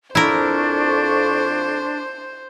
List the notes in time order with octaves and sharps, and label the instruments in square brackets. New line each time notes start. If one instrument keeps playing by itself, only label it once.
[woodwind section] F2 C#6 [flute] D4 [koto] E4 A#4 [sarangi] C5